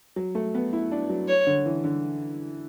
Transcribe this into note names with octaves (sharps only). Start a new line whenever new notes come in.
F#3
A3
B3
E4
D4
F#3
C#5
D3
E3
D3